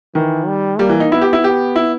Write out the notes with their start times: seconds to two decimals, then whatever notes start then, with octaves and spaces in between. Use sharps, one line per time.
0.15 D#3 E3
0.47 G3
0.79 G3 A#3
0.89 E3
1.00 D#4
1.11 B3 E4
1.21 G4
1.33 E4
1.44 G4
1.76 E4